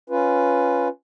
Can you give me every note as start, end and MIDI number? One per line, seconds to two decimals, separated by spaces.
0.10 0.88 61
0.10 0.88 65
0.10 0.88 71